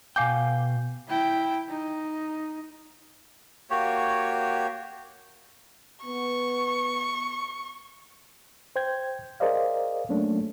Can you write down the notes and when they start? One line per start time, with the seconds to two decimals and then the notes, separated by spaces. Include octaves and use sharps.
0.16 B2 F5 G5 G#5 D6 G6
1.08 E4 G5
1.69 D#4
3.70 A#3 F#4 G4 C#5
6.05 B3 C#6
8.76 C5 G5 G6 G#6
9.40 G#4 A#4 C5 D5 D#5 F5
10.09 F#3 A3 A#3 C#4 D4